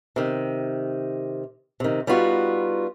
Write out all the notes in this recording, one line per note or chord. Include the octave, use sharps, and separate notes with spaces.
C3 D#3
C3 D#3
G3 B3 D#4 F4 F#4